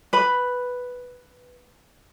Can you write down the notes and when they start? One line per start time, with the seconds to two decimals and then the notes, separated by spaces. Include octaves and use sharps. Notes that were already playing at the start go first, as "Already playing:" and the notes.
0.13 B4 B5